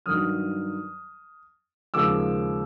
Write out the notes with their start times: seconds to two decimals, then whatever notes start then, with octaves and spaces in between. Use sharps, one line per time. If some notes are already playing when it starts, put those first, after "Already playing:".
0.06 G2 D#3 F#3 D#6 F6
1.94 D#2 C#3 F3 G#3 D6 E6